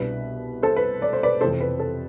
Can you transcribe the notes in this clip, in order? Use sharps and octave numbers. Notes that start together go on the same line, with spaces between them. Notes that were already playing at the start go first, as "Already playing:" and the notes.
Already playing: C2 B2 B3 D4 B4
A4 C5
B4
D5
C5
B4 D5
F2 C3 E3 A4 C5
B4
A4